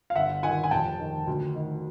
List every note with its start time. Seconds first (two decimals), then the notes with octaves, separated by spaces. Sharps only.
0.10 F5
0.15 G1 E5 F#5
0.43 D#3 F#5 G#5
0.64 G#5
0.71 F1 G5 A5
0.99 D#3
1.27 D2
1.55 D#3